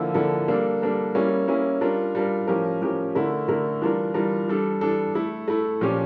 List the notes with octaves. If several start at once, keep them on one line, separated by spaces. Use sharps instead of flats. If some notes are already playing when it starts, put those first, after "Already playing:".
Already playing: D3 F3 A#3 E4 A4
D3 F3 A#3 E4 A4
G3 A#3 D4 A4
G3 A#3 D4 A4
G3 A#3 C#4 E4
G3 A#3 C#4 E4
G3 D4 F4 A#4
G3 D4 F4 A#4
A2 F3 C#4 G4 A#4
A2 F3 C#4 G4 A#4
D3 A3 E4 A#4
D3 A3 E4 A#4
E3 G3 D4 F4 A#4
E3 G3 D4 F4 A#4
E3 G3 D4 A4
E3 G3 D4 A4
A3 E4 A4
A3 E4 A4
A#2 F3 C#4 G4